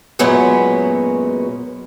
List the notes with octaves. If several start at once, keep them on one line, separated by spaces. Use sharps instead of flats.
F#2 A#2 F#3 G#3 B3 C#4